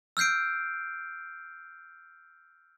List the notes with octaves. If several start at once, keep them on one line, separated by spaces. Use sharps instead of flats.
E6 F6 G6 C7 D7